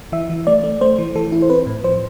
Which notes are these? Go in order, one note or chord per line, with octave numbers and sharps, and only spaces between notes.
E3 E5
E3
A3 D5
A3
A3 C5
E3
E3 A4
E4
C5
C4 B4
A2
F3 C5